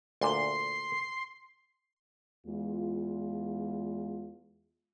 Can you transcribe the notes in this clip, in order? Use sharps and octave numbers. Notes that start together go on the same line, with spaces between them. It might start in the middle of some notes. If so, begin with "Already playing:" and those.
D2 A#2 C6
E2 G#3 F4